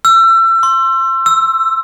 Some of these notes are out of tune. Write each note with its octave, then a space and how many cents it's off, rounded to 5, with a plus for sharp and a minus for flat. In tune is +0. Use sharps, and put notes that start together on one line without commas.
E6 +30
C6 +25
E6 +10